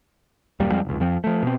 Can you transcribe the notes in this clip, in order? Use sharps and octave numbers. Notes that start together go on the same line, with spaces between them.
D#1 F#2 G3 A#3
F2 G3 G#3 C4
F1 C#2
F2 F3 C4
F3 A3
B2 C4